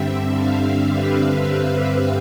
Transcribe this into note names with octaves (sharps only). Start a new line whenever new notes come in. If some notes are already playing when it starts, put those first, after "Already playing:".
Already playing: G2 D3 G3 C4 E5
F5
B4